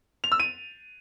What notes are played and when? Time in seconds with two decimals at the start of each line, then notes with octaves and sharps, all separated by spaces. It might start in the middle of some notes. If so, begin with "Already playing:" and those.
0.24 F7
0.32 E6
0.40 D#7